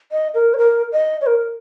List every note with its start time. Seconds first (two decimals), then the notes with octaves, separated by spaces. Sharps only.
0.12 D#5
0.34 A#4
0.54 C#5
0.58 A#4
0.92 D#5
1.21 C#5
1.26 A#4